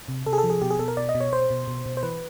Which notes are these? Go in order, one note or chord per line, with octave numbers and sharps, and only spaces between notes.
C3
C3 A4
G#4
A4
F3
G#4
B2 G4
G#4
B2 A4
A#4
B2 D5
D#5
B2
C#5
B2 C5
B2
B2
B2
C5
E3 B4